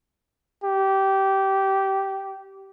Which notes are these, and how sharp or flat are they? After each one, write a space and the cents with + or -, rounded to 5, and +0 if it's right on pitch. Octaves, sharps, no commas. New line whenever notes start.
G4 -15